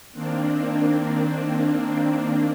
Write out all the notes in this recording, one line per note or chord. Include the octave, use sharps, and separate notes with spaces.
D#3 A#3 C4 D4